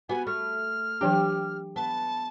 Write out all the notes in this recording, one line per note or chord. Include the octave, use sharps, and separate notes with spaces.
B3 F#4 G4 G#5
A3 F6
E3 F#3 D4 G4
B3 A5